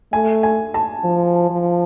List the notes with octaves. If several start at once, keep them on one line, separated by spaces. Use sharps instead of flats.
A3 G#5
G#5
A5
F3
F3